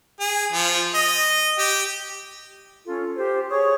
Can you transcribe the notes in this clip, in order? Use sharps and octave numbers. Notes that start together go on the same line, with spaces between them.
G#4
F3
D#5
G4
C#4 F4 A4
G4 C5
G#4 C#5 C#6 D#6